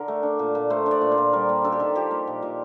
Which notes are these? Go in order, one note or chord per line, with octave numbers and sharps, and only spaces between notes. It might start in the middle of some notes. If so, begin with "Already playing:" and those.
Already playing: D3 A#4
A3
D4
A#2
A#2
A3 C5
D4
D5
A#2
C5
A#2
G3 A#4
A#3
D4 A4
G4
D#3 A4
F3 G4
A#3
A#2
A#2